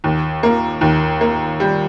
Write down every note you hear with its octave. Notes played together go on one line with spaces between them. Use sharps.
D#2
A#3
D#2
A#3
G3